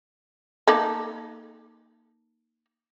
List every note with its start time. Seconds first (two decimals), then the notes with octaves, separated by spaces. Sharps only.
0.67 A#3 D#4 A4